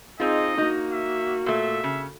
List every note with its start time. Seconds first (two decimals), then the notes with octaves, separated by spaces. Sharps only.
0.20 C4 D#4 F4 G#4 D#5
0.58 A#3 D#4 F#4
0.92 E5
1.46 A#2 A3 E5
1.84 C#3